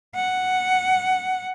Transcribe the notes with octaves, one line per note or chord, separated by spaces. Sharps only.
F#5